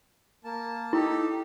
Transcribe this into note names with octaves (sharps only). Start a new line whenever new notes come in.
A#3 A5
D#4 E4 G4 A4